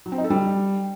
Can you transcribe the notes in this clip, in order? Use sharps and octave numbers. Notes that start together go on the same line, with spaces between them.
F#3
C4
D#4
A4
G3